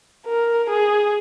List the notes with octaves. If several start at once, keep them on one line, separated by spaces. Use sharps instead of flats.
A#4
G#4